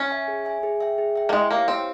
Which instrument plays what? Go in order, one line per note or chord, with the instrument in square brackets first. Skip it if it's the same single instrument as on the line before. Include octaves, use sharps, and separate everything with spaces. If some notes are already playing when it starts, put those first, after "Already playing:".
Already playing: [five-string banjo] C#4
[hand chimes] E5 G#5
G#4
E5 G#5
G#4
E5 G5
G#4
E5 G5
[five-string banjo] A#3
[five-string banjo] G#3 [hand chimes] E4
[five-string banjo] A#3 [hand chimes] G4 C#5 F5
[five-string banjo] C4 [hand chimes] E4